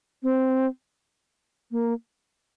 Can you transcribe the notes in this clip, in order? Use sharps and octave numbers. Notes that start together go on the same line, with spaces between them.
C4
A#3